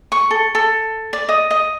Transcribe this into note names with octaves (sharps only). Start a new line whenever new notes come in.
C#6
A4
A4
D5
D#5
D#5